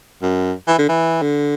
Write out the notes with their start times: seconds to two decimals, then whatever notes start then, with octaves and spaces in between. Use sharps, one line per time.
0.22 F#2
0.68 E3
0.79 D3
0.89 E3
1.22 D3